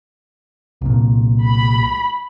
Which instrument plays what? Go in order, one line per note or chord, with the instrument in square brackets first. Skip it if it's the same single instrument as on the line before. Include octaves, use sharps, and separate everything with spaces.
[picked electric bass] C2 A#2
[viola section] B5